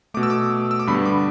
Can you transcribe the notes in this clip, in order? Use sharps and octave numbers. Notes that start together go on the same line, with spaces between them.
B2 A3 D6
E6
D6
E6
D6
G2 D3 G3 B3 B5
D6